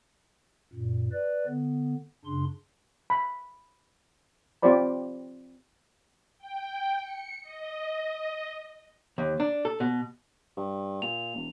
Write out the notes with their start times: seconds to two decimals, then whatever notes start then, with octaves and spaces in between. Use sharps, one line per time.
0.73 F#2 A#2
1.13 B4 D5
1.46 D3 B3
2.25 F#2 C#3 D4 C6
3.10 B5
4.62 C4 F4 G4 C5 D5 B5
6.38 G5
7.00 C#7
7.42 D#5
9.18 D#2
9.40 D4
9.65 A4
9.80 B2
10.57 G2
11.02 A#2 F7
11.35 E1